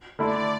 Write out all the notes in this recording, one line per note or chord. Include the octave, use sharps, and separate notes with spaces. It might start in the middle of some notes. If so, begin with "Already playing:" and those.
D3 A3 E4 D5